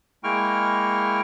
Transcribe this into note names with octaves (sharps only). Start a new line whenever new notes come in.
G#3 A#3 E4 G5 C#6 F6